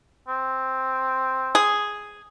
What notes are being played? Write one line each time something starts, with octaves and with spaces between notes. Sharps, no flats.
C4
G#4